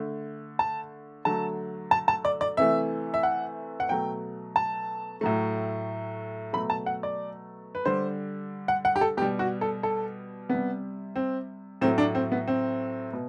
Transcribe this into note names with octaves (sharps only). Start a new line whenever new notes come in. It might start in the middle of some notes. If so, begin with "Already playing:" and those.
Already playing: D3 A3
A5
D3 F#3 A3 A5
A5
A5
D5
D5
C3 E3 A3 E5
E5
F#5
F#5
B2 F#3 A3 G5
A5
A2 F#3 A3
B2 F#3 A3 B5
A5
F#5
D5
B4
D3 G3 C5
F#5
F#5
G4
A4
B2 G3 G4
F#4
A4
A4
C3 G3 B3
C4
A2 F#3 A3 C4
D4
C4
B3
C4
B2